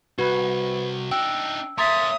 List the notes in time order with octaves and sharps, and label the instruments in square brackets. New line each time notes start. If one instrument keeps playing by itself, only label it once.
[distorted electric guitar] C2 [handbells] F#4 [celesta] B4 B5
[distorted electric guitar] D4 D#4 [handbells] G5 [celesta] E6
[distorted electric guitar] A#3 C#4 [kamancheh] E5 D#6 [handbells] A#5 [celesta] C6 A6 B6